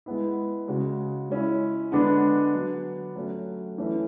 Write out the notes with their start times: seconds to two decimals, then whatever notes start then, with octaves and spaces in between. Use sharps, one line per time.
0.06 G#3 B3 E4
0.68 C#3 G#3 C#4 F#4
1.29 G#3 C#4 E4
1.92 D3 G#3 B3 D4
2.54 D3 F#3 B3
3.16 F#3 A3 C#4
3.78 E3 A3 C#4